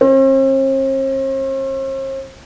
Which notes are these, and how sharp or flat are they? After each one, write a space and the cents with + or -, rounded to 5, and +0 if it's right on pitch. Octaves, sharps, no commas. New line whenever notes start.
C4 +45